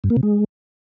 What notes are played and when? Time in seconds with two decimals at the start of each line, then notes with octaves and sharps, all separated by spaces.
0.04 G2
0.10 A#3
0.16 C3
0.23 G#3